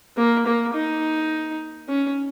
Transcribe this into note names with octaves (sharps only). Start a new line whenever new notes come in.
A#3
A#3
D#4
C#4